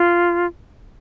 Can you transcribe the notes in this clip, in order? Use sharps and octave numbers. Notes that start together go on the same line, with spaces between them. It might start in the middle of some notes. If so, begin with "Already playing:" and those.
Already playing: F4